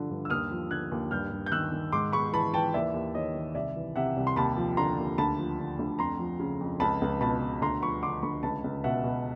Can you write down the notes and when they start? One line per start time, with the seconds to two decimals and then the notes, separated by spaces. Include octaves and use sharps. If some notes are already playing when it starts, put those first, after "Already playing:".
Already playing: G2 D3 F3
0.10 G2
0.25 E6
0.30 D#2 D#6 F6
0.51 F3
0.71 D3 F#6 G#6
0.92 D#2
1.11 G2 F6 G6
1.31 G2
1.46 G6
1.52 D#3 E6 F#6
1.72 D#3
1.92 G#2 C6 D6
2.12 G#2 B5 C#6
2.33 E3 A5 B5
2.53 E3 G5 A5
2.74 D#2 D5 E5
2.94 D#2
3.15 D#3 C#5 D#5
3.35 D#3
3.55 C2 D5 E5
3.76 E3
3.96 C3 E5 F#5
4.17 C2
4.27 C6
4.36 D#2 A5 B5
4.57 F3
4.77 D3 A#5 C6
4.98 D#2
5.18 D2 A5 B5
5.38 F3
5.59 D3
5.79 D2
5.99 F2 A#5 C6
6.19 F3
6.40 C#3
6.61 F2
6.80 C#2 A5 B5
7.02 C#2
7.21 B2 A5 B5
7.41 B2
7.61 D2 A#5 C6
7.82 F3 B5 C#6
8.02 D3 C6 D6
8.23 D2 B5 C#6
8.43 C#2 A5 B5
8.64 C#2
8.84 B2 E5 F#5
9.04 B2